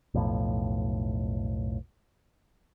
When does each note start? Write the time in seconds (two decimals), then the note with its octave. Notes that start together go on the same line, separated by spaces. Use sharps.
0.14 B1 F2 A2